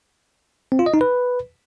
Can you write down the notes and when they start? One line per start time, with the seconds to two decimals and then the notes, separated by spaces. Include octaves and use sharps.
0.72 C4
0.79 F4
0.86 D#5
0.94 D#4
1.01 B4